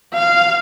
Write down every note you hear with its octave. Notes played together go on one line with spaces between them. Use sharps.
F5